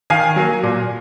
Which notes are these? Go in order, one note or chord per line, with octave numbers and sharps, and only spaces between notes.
D#3 F5 G#5
F#3 A#3
A#2